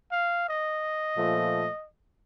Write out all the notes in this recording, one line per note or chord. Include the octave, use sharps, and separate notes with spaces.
F5
D#5
A#2 F3 A3